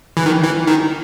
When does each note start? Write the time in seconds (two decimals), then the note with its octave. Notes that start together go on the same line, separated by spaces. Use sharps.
0.17 E3
0.26 D#3
0.44 E3
0.67 D#3